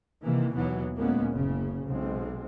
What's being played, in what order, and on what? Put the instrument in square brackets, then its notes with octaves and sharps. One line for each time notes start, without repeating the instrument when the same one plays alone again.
[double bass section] C3 D#3 E3 A#3
D#2 B2 E3 F#3 B3
D2 A#2 G#3 A#3 B3 C#4
F#1 C#3
B1 G#3 C4